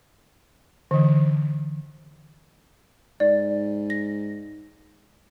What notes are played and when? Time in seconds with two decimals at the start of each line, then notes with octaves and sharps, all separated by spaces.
0.91 D3 E3
3.20 G#2 D5
3.90 A#6